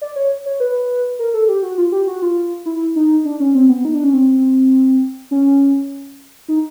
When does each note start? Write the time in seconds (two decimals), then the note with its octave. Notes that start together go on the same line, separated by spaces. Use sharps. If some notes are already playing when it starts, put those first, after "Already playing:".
0.02 D5
0.16 C#5
0.46 C#5
0.60 B4
1.19 A#4
1.34 A4
1.48 G4
1.63 F#4
1.78 F4
1.92 G4
2.07 F#4
2.22 F4
2.66 E4
2.96 D#4
3.25 D4
3.40 C#4
3.55 C4
3.69 B3
3.85 D#4
3.94 D4
4.04 C#4
4.13 C4
5.31 C#4
6.48 D#4